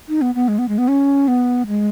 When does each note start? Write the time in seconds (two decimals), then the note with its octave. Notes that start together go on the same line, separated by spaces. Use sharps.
0.09 D#4
0.21 B3
0.35 B3
0.48 G#3
0.58 B3
0.68 G#3
0.78 B3
0.88 C#4
1.28 B3
1.67 G#3